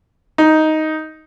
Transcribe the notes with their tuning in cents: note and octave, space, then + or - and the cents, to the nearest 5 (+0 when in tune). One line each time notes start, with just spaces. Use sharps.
D#4 +5